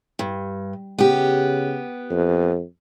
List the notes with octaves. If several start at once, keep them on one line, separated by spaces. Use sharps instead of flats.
G2
C#3 B3 G4
F2